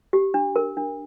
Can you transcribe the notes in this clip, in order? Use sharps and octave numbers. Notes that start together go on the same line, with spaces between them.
G4
D4
A#4
D4